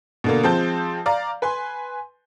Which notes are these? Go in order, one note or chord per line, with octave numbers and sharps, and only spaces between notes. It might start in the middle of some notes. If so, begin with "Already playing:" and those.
B2 D3 A#3
F3 G#3 C4 A5 G6
D5 F5 A#5
B4 G#5 C6